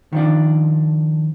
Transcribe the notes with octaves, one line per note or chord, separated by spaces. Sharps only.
D#3 F3 D4